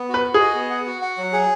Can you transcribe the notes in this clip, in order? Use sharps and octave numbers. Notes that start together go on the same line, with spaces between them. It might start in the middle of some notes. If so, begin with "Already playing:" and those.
Already playing: B3
F#4 B4
F#4
G#4
D#5
B3
F#5
F#4
F#5
F#3
G#4